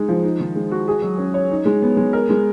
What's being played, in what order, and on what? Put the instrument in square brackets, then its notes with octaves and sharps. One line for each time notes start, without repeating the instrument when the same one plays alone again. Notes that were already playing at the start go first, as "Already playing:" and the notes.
Already playing: [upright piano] G#3 D#4
F3
D#4
D#3
G#3
F#4
G#4
F#3
C#4
C#5
D#4
G#3
B3
G#3
A#4
G#3